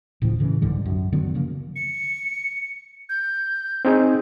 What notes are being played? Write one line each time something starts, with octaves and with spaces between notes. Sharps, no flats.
D1 A2 C#3 F3
A2 C#3 E3
B1 G#2 D3 G3
F#2
D3 D#3 F#3 B3
C#3 F3 A#3
C#7
G6
C4 D#4 G#4